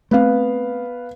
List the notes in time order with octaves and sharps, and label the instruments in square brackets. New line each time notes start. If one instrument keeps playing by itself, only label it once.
[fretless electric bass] A3 C4 [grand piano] B3 B4 F5